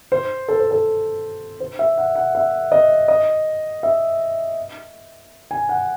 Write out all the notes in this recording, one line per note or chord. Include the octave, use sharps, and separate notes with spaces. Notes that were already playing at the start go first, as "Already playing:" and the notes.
C5
A4
C5
A4
C5
E5
F#5
F#5
E5
D#5
D#5
E5
G#5
F#5